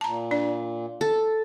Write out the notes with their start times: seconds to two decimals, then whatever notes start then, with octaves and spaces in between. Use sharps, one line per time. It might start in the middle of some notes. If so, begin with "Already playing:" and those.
0.01 A#2 A5 A#5
0.31 D4 D5
1.01 A4